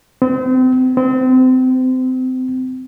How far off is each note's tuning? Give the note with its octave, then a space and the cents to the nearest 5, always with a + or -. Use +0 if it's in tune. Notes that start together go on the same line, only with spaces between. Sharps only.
C4 -35
C4 -30